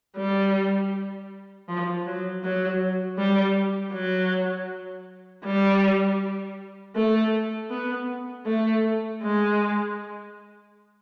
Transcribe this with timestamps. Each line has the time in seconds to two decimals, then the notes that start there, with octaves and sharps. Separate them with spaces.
0.17 G3
1.69 F3
2.06 F#3
2.44 F#3
3.18 G3
3.94 F#3
5.45 G3
6.96 A3
7.71 B3
8.46 A3
9.23 G#3